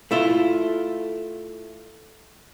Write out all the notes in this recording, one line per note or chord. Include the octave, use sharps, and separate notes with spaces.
A3 E4 F4